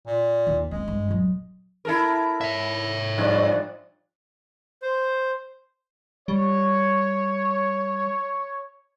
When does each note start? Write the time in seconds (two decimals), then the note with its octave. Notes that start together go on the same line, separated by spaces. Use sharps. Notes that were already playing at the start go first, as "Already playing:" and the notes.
0.07 A#2
0.47 D#2
0.71 G#3 A#3 C4
0.88 G2
1.08 D#1 F#3
1.85 E4 A4 A#4
2.41 C#5 E5
3.18 G2 F3 D5
4.82 C5
6.28 G3 C#5